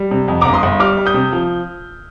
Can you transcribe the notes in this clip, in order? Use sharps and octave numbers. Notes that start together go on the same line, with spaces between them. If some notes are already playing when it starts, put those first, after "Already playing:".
Already playing: G3
C3
F2
G1 A#5 D6
C6 D#6
G1
G3 D6 F6
G3
D#6 G6
C3
F3